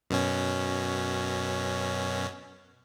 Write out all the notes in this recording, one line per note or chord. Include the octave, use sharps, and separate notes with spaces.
F#2 B2 C#4